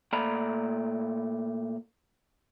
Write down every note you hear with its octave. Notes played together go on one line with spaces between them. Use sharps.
A#2 A3 D5 A#5 B5